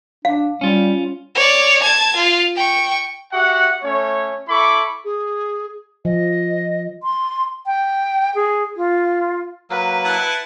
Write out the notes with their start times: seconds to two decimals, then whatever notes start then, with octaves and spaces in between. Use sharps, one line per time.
0.25 D4 F5
0.61 G3 C#4 F4
1.35 C#5 D5
1.83 A5 G#6
2.16 F4
2.56 G5 C#6
3.32 F#4 G4 E5 F#5
3.82 A3 C#4 C#5
4.49 E4 A4 B5 C#6 D6
5.04 G#4
6.05 F3 D#5
7.03 C6
7.66 G5
8.35 G#4
8.77 F4
9.70 F#3 A#3 A#4 B4
10.04 E4 F#5 A5